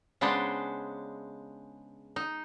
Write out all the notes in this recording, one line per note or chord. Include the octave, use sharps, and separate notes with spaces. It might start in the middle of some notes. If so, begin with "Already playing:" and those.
C#3 G#3 B3 D4 C5
D#4